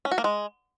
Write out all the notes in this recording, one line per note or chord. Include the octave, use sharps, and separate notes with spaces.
C#4
F#4
A#3
G#3